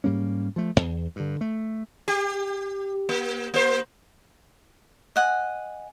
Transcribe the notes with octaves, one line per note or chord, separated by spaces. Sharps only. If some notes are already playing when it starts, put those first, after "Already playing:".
G#2 G3 A#3 C#4
F3 A3
D#1 E2
G2 D3
A3
G4
A#3
A#3 C5
D#5 F#5 G#5